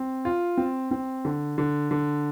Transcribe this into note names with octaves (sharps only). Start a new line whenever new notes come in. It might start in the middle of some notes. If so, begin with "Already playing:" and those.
Already playing: C4
F4
C4
C4
D3
D3
D3